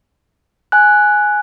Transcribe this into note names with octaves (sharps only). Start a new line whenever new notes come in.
G#5 F#6